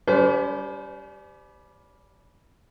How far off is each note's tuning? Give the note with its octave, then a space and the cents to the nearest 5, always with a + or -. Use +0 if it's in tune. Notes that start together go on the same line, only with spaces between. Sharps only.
G3 +0 C#4 +40 C5 -35